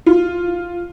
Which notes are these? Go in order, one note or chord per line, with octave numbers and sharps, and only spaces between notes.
F4